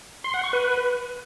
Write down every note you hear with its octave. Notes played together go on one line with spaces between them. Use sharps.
C6
F#5
C#6
B4